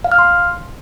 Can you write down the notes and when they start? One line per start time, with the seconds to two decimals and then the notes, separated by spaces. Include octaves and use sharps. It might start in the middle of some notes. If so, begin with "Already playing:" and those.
0.04 F5
0.12 F6
0.19 C6